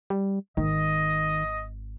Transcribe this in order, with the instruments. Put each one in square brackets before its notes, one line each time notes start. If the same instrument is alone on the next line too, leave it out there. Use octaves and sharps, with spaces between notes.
[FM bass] G3
[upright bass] G#1 [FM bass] D#3 [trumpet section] D#5